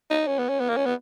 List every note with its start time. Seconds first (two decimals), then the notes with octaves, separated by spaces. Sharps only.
0.10 D#4
0.27 C#4
0.38 B3
0.49 C#4
0.60 B3
0.69 A#3
0.77 C#4
0.85 B3